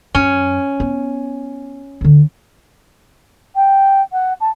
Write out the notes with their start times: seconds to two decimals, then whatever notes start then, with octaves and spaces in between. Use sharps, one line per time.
0.15 F#2 C#4
0.80 B3
2.01 D2 D3
3.55 G5
4.12 F#5
4.40 A5